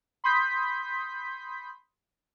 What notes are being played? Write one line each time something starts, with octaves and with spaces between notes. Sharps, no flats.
B5 C6 D#6 G6 B6